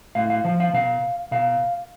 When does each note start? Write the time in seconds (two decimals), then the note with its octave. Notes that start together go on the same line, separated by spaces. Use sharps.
0.15 A2 F5
0.30 F5
0.45 F3 F5
0.60 F5
0.73 B2 F5
1.31 B2 F5